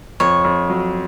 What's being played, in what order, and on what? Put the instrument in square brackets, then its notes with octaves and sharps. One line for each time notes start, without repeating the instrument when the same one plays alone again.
[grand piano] F2 [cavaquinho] C#5
[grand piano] F2
F#3